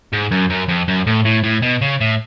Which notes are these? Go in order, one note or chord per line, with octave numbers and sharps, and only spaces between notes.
G#2
F#2
F#2
F2
F#2
A2
A2
A2
B2
C#3
A2